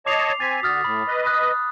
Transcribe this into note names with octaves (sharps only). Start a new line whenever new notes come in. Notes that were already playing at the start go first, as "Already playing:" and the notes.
C#5 D#5 A5 D6 C7 F7
C4 G#5 A6 B6
D3 F#4 D#6 F6 A6
A2 B5
B4 D#5
D#6 F#6